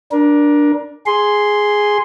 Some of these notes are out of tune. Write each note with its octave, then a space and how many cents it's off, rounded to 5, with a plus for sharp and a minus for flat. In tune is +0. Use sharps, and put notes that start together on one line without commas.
D4 +0 A#4 +25
G#4 +0 C6 +0